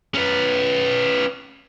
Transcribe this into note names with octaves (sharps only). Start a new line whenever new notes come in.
C#4 B4